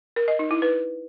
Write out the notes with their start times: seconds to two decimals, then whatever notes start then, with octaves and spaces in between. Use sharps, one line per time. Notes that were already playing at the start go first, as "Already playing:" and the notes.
0.16 A#4
0.28 D#5
0.39 D#4
0.51 E4
0.62 B4